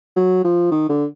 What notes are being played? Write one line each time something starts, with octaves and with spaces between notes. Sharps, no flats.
F#3
F3
D#3
D3